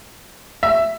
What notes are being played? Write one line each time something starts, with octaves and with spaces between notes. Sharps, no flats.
E5